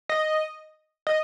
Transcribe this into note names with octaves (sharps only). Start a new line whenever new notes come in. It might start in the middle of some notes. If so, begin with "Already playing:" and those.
D#5
D#5